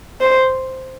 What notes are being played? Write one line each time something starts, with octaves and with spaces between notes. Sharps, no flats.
C5